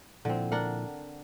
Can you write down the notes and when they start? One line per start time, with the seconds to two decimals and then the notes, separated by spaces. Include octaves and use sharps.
0.25 A#2 D3 F3 C4 E4
0.52 D4 A#4 F#5